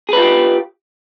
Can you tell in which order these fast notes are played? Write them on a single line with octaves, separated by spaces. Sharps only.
G#4 B4 F4 G4